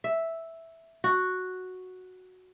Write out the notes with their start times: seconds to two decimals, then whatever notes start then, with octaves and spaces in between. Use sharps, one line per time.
0.04 E5
1.04 F#4